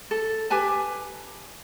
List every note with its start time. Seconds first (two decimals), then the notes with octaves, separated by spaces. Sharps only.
0.11 A4
0.50 G4 B4 G#5 A5